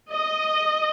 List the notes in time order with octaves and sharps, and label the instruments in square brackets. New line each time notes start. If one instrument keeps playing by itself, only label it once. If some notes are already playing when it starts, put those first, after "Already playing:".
[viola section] D#5